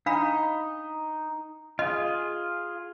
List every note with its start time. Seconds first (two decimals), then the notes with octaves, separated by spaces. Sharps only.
0.06 D4 D#4 F5 B5
1.79 F4 G#4 D#5